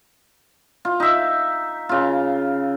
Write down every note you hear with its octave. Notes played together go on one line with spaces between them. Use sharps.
F4
D#4 E5
C#3 F4